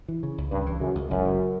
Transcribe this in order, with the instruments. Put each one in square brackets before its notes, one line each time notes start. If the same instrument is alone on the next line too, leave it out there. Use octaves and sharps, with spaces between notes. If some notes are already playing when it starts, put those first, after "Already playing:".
[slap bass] E3
C#3
C#2
[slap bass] C#2 [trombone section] G2
[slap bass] E3
[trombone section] F#2 [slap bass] C#3
[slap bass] C#2
[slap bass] F#1 [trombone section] F#2
[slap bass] C#3